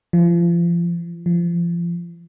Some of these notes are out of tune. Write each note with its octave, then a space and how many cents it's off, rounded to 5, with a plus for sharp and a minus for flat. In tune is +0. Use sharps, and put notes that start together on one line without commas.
F3 -35
F3 -30